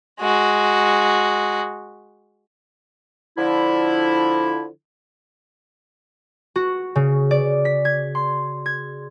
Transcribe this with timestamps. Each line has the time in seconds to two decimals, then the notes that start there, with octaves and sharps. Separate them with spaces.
0.20 G#3 F#4
3.38 D3 F3 E4
6.56 F#4
6.95 C#3
7.31 D5
7.65 B6
7.85 G#6
8.15 C6
8.66 G#6